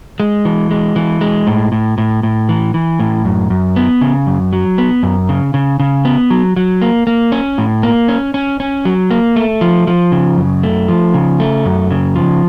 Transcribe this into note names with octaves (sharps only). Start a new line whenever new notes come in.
G#3
E3
G#3
E3
G#3
A2
A2
A2
A2
E3
E3
A2
F#2
F#2
B3
C#3
F#2
F#3
B3
F#2
C#3
C#3
C#3
B3
F#3
F#3
A#3
A#3
C#4
A2
A#3
C#4
C#4
C#4
F#3
A#3
A3
F3
F3
C#3
F#2
A3
F3
C#3
A3
F#2
C#3
F3